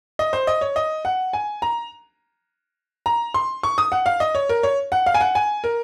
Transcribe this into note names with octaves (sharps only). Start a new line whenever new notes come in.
D#5
C5
D#5
C#5
D#5
F#5
G#5
A#5
A#5
C6
C#6
D#6
F#5
F5
D#5
C#5
A#4
C#5
F#5
F5
G#5
F#5
G#5
A#4